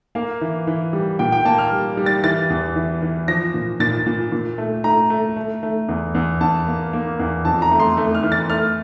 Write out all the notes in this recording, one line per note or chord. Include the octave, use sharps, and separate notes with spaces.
A#3 F5
E3
E3
G3
A#2 G5
G5
A#3 A5
F6
G3
G3
A6
E3 A6
E2
E3
E3
F3 A#6
A#2
A#2 A6
A#2
A#2
A3
A3 A#5
A3
A3
A3
E2
E2
E2 A5
A#3
A#3
E2
F2 A5
A#5
A3
C6
A3
F6
E3
A6
A3 F6